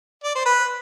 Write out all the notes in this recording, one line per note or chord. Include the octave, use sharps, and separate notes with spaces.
D5
C5
B4